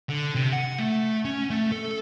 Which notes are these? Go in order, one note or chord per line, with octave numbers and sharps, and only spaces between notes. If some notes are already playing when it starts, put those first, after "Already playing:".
D3
C3
F#5
A3
C#4
A3
A4